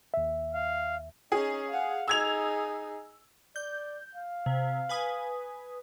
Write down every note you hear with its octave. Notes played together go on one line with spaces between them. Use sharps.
D#2 E5
F5
C#4 D#4 G#4
F5 F#5
D#4 G#4 E6 G#6 F7
D5 G6
F5
C3
B4 G#5 D#6